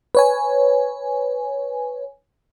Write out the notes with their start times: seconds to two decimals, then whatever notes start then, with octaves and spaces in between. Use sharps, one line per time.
0.15 B4 C#5 G#5